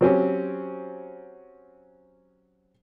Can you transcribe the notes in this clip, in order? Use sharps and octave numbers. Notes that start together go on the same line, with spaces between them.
F#3 C4 C#4 G4